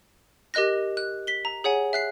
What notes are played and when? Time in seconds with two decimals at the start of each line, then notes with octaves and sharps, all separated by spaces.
0.54 G4 A#4 D#5 F#6 A#6
0.97 F#6
1.27 B6 G7
1.45 A#5
1.64 G#4 C#5 F#5 G#5
1.93 E5 F#6 C7